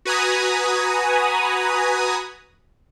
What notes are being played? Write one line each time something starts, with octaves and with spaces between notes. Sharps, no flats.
F#4 B4 G#5 A#5 D#6